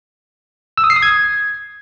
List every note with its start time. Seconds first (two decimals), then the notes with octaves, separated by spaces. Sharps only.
0.78 E6
0.84 D#6
0.90 C7
0.96 D#6
1.03 G#6